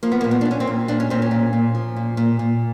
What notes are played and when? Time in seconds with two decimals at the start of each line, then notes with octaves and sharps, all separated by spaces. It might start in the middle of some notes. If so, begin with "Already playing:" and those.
0.03 F3 A#3
0.12 B3
0.21 A#3
0.24 A#2
0.31 B3
0.41 D4
0.45 A#2
0.51 C#4
0.60 C4
0.67 A#2
0.88 A#2 D4
1.00 C#4
1.10 A#2 C4
1.22 C#4
1.31 A#2
1.53 A#2
1.75 F3
1.96 A#2
2.17 A#2
2.39 A#2